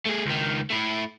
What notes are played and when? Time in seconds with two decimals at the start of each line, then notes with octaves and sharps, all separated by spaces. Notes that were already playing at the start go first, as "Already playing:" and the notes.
0.06 A3 G#4
0.26 C#2 D#3
0.70 A3 E4